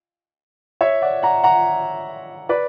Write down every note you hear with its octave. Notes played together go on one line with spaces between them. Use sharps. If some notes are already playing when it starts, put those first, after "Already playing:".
C#5 E5
D5 F#5
F#5 A#5
F#5 A#5
B4 D5